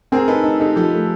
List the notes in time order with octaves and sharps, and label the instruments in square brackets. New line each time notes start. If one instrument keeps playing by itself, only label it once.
[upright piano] C4 [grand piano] G#4 A#4
[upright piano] D#4 [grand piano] A4 B4
[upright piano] D#4
[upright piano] D#4 [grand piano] G4 A4
[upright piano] F3 [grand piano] G4 A4
[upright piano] A3